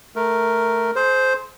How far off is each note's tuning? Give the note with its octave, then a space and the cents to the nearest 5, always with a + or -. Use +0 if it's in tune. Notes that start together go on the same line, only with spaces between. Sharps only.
A3 +0 A#4 +0
G#4 +45 C5 +0